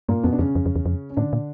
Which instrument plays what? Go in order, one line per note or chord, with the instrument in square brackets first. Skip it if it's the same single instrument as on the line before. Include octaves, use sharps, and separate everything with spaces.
[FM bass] G2 [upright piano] A#2 A#3
[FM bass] F2 [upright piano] B2 B3
[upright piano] D4
[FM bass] F2 [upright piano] C#3 C#4
[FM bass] F2
F2
E2
F2
[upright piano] C#4
[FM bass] A2 [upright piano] D3 D4
[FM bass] A#2